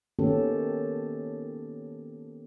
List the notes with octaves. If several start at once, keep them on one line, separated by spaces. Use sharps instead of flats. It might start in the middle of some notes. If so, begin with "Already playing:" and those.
D#3 A#3 B3 C#4 G4 A4